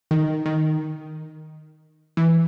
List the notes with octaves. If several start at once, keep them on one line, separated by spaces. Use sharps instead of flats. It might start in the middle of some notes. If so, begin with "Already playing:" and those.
D#3
D#3
E3